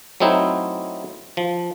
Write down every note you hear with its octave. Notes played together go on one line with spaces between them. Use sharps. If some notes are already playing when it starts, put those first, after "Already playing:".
F#3 A3 C4 D#4 E4
F3